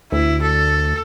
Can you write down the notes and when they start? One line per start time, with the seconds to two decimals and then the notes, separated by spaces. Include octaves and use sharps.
0.12 D2 E4
0.42 A4